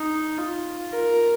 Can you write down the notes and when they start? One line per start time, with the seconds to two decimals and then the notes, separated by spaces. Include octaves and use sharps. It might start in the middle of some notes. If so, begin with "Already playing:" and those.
Already playing: D#4
0.38 F4
0.93 A#4